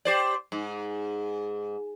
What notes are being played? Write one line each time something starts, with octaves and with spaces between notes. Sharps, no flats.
G4 C5 D5
G#2